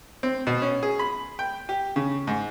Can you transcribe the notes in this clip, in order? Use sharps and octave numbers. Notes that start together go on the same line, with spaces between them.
C4
B2
C#4
G#4
B5
G5
G4
C#3
G#2